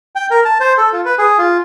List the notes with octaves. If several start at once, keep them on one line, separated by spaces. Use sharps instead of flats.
G5
A#4
A5
C5
A4
F4
B4
G#4
F4